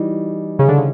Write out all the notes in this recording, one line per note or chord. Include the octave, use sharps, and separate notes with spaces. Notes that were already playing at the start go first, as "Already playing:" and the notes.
Already playing: E3 G3 D#4 F#4
C#3
D3
C#3